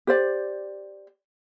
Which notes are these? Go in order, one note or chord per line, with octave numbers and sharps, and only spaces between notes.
G4 C5 D5